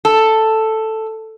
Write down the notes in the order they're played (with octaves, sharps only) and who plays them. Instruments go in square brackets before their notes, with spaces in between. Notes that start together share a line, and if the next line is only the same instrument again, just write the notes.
[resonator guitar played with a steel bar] A4